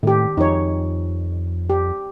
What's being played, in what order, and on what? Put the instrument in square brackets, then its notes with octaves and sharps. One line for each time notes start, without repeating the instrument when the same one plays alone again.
[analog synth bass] A2 [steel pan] D#3 G4
[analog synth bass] F2 [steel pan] D#4 C#5
[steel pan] G4